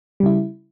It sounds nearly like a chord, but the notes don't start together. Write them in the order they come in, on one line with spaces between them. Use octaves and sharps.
G3 C#3 E4